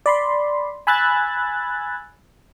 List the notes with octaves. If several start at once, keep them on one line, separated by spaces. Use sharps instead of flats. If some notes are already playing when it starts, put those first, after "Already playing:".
D5 B5 C6
G#5 B5 E6 F#6 G#6 A6